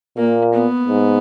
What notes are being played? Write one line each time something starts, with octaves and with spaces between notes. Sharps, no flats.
A#2 A#3
B3
G#2